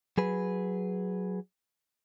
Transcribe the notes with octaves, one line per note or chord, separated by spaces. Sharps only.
F#3 G#4 B4